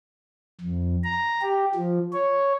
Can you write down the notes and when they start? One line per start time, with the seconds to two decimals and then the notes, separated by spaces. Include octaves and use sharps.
0.61 F2
1.04 A#5
1.42 G4
1.75 F3
2.13 C#5